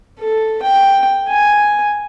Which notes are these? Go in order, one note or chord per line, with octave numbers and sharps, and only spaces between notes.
A4
G5
G#5